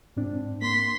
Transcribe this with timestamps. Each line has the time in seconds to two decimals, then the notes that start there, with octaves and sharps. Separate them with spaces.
0.17 G#2 C4 D4
0.62 A#3 C6 B6